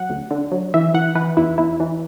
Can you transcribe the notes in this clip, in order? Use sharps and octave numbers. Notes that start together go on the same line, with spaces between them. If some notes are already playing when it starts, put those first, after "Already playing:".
Already playing: F#3 F#5
D2
D3
F#3
E3 E5
E3 F#5
E3 B4
E2 E4
E2 E4
E3